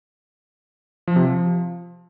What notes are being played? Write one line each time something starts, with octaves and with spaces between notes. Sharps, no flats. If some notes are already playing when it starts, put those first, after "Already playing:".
F3
C3
F3